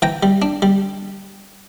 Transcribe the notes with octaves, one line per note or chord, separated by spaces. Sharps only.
E3 G5 A#5
G3
D4
G3